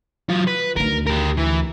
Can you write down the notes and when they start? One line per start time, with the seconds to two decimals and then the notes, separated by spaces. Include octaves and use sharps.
0.29 F#3 F4
0.47 B4
0.76 D2 D#3 A#4
1.06 G4 A#4
1.37 E3